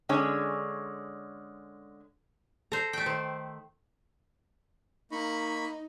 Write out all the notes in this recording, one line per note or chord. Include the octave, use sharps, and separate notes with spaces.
D3 G#3 C#4 C#5 G#5
A4 C5 A#5
A3 G5
D#3 C5
A#3 D#4 B5 C#6